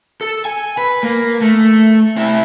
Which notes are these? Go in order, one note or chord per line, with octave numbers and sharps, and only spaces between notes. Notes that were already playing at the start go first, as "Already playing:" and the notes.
A4
G#5
B4
A#3
A3
C4 E4